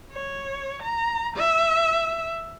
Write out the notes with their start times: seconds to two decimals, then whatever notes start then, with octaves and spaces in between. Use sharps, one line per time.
0.12 C#5
0.82 A#5
1.37 E5